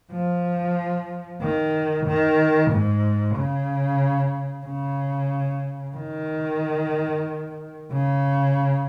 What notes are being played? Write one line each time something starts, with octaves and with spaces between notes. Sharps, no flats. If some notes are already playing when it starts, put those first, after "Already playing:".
F3
D#3
D#3
G#2
C#3
C#3
D#3
C#3